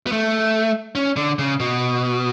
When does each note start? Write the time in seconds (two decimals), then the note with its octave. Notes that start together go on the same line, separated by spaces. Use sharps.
0.07 B3
0.12 A3
0.95 C#4
1.16 D3
1.39 C#3
1.60 B2